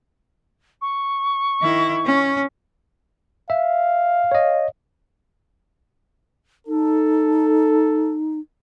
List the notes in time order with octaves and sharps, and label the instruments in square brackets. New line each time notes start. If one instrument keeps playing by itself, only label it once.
[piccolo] C#6
[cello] D#3 E4
C#4
[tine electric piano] E5 [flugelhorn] F5
[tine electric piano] C#5 D#5
[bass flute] D#4 [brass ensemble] A4